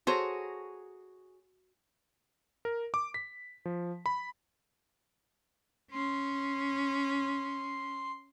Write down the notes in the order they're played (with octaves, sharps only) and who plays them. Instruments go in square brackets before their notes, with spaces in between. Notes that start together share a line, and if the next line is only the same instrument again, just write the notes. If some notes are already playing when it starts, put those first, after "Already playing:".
[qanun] F#4 G#4 A#5 [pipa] A4 C5 C#5
[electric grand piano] A#4
D6
B6
F3
B5
[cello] C#4 [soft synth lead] C6